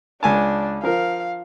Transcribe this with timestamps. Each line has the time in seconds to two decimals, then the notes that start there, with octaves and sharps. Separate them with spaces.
0.23 C#2 D4 G#5 A5
0.83 F3 A#4 F5